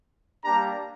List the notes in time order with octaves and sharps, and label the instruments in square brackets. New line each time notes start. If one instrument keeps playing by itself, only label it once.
[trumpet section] G3 A#3 D4 G4 A#5